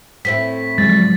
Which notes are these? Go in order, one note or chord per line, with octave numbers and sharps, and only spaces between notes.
A2 C4 E4 B6
D3 F3 F#3 G#3 A6